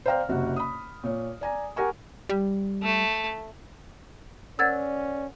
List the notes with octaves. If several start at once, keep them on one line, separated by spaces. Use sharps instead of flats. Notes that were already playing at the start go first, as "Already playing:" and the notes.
C5 D5 F5 G5 A#5 F6
F#1 C3 F#4
B5 D#6
A#2 C#5
D5 G#5 A#5
G4 A#4 F#5 G#5 C#6
G3
A3
C#4 A#4 C5 D5 F#5 E6 G#6 A6